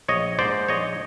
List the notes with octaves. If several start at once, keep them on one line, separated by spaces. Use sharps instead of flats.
A#1 C#5 D#5
G#2 C5 D5
A#1 C#5 D#5